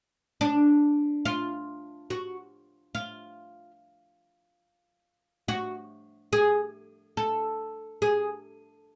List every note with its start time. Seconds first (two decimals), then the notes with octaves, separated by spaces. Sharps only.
0.41 D4
1.25 F4
2.10 F#4
2.95 F4
5.48 F#4
6.33 G#4
7.17 A4
8.02 G#4